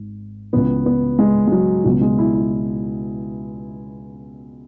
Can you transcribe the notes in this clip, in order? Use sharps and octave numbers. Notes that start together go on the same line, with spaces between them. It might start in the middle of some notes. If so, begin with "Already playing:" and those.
Already playing: G#1 G#2
C#2 C#3 E3 B3
B3
G#3
G#3
F#3
C#2 B2 F#3
G#3
E4
E4